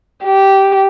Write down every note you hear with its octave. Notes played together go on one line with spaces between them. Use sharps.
G4